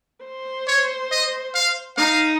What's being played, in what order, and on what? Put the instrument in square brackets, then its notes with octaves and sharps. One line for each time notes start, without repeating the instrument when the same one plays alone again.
[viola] C5
[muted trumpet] C#5
D#5
F5
[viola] D#4 [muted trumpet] F5